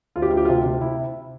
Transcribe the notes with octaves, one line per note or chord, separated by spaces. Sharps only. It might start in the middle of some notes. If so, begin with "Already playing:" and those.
D2 F4
G4
D2 F4
G4
C3 F4
C3
E4